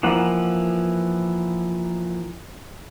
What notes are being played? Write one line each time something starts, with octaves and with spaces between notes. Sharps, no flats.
E3 F3 A#3 F#5